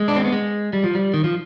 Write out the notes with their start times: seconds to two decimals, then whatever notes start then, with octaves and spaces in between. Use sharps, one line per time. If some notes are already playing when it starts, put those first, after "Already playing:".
Already playing: G#3
0.08 D4
0.16 C4
0.25 B3
0.33 G#3
0.73 G3
0.84 F3
0.95 G3
1.14 D#3
1.24 F3